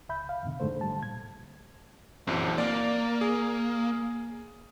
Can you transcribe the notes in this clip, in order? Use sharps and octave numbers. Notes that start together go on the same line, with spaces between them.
C#2 E5 B5 G6
F5
F2 G#2 B2 D3
F2 G#2 D3 A3 C5
G3 A5
A#2 G#6
A#1 F#2 E3 C4
A#3 D5
G#4